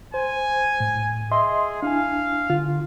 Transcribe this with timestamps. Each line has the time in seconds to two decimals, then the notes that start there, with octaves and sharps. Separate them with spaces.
0.14 C5 G#5
0.80 A2
1.31 G#4 D#5 E5 C6
1.83 D4 E4 F5 G#5
2.50 D3 F4